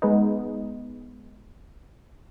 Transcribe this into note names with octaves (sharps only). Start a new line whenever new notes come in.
G#3 B3 D#4